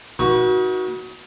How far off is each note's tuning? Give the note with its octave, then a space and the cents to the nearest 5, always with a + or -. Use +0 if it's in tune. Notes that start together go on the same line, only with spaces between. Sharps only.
D#4 +30 F#4 +0 B4 -45